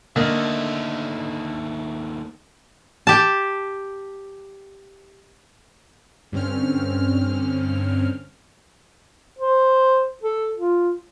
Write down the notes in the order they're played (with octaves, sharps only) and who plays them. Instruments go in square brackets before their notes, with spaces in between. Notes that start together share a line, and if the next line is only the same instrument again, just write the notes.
[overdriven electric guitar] D#2 A3 [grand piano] D3 D#5 [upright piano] A#3
[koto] G4 A5
[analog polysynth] G2 D3 C4 C#4 F6
[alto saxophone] C5
A4
F4